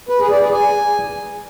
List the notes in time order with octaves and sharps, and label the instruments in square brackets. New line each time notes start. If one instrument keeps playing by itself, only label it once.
[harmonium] B4
G#4
D5
G#4
G#5